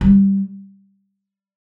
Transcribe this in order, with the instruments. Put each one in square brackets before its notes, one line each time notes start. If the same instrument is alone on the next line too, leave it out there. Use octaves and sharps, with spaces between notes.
[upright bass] G3